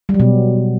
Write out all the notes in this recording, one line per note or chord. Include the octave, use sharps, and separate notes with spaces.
G3
F#3
B2